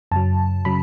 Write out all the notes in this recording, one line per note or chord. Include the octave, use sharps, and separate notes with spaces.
F#2 C#3 F#3 A5
C#3 F#3 B5